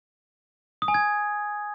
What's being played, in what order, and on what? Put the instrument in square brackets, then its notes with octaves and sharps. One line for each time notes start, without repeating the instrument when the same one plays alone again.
[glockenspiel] D#6
G#5
G#6